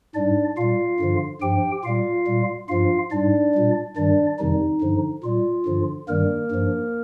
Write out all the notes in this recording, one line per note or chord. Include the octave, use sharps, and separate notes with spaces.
G#2 G3 D4 D5
A#2 G3 F4 F5
G2 D3 F3
G2 F3 G4 G5
A#2 G3 F4 F5
A#2 G3
G2 F3 F4 F5
G#2 G3 D4 D5
A#2 G3
G2 D#3 G3 D4 D5
F2 C3 D#3 G3 D#4
G2 D3 F3
A#2 G3 F4
G2 D3 F3
G2 D#3 G3 A#3 A#4
G2 F3